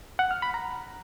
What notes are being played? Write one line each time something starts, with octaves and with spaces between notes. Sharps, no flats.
F#5
F6
B5
A#5